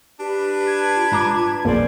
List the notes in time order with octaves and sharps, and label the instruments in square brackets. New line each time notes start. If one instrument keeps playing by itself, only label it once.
[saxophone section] D4 B4 [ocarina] G4
[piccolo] G#6
[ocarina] F4
[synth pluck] G#2 A#5 D6
[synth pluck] B1 F2 A#3 [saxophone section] C#4 C5 D5 [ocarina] G#4